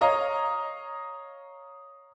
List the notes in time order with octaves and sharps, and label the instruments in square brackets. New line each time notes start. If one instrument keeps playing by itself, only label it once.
[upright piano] C#5 D#5 F5 A#5